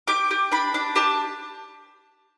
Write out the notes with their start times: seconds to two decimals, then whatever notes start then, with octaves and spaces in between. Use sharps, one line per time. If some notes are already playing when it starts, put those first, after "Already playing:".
0.08 G4 D6
0.31 G4
0.52 D4 B5
0.74 D4
0.95 G4 A5